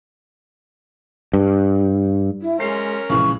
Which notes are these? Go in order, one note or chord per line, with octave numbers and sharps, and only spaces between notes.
G2
E4
G#3 C#4 A#4 C7
A#1 C#3 E3 G#3 C#6